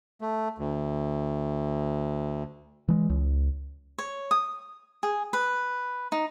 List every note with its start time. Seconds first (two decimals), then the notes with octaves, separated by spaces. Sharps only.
0.21 A3
0.58 D2
2.88 E3 G#3
3.10 C#2
3.98 C#5
4.31 D#6
5.03 G#4
5.33 B4
6.12 D#4